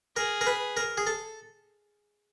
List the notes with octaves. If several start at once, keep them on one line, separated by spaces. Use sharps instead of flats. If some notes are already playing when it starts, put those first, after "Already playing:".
G#4 A#4
A#4
B4
A#4
G#4
A4